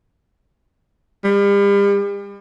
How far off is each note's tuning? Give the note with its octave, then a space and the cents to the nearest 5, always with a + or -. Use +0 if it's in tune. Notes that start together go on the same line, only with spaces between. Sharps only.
G3 +40